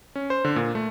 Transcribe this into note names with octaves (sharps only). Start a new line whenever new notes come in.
C#4
C5
D3
A#2
A3